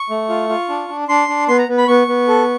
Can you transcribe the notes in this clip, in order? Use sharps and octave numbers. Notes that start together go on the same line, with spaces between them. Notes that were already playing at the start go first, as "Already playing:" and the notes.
Already playing: C#6
A3
F4
F4
D4
D4
D4 C6
D4
B3 C6
A#5
B3
B5
B3 C#6
B3
A4